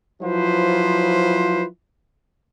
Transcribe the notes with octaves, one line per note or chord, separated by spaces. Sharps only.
F3 F#3 E4 F4 B4 C5